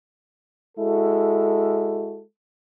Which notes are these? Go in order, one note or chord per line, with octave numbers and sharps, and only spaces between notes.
G#3 E4 F#4 A4